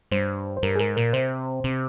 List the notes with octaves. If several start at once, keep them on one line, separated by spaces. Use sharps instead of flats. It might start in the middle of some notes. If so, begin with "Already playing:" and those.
G2 C5
C5
G2 A#4
G#4
G#2 A#4
A#2 A#4
C3 C5
C3